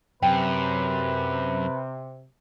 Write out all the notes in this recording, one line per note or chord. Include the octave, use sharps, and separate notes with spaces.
F#2 C3 B4 G5